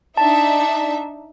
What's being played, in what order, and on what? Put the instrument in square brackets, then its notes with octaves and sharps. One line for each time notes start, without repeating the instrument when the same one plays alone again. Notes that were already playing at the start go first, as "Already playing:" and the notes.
[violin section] D4 D#4 E5 [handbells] A5